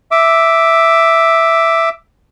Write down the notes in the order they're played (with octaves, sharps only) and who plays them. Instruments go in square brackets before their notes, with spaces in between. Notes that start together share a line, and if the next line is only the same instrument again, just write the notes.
[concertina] E5 D6